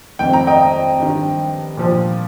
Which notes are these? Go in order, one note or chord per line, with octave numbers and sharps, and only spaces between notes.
F2 D#3 G5
A#5
D#5 G5
G2 D#3
A#2 F3